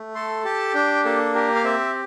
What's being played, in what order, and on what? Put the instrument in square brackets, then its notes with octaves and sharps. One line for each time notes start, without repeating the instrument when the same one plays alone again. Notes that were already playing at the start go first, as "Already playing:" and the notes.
Already playing: [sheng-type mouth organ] A3
A4 C6
G4 A5
D4 G5
A#3 A4
G4 A#4
F5
C4 E5